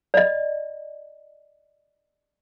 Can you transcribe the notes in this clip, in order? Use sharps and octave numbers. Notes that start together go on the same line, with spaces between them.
D5 D#5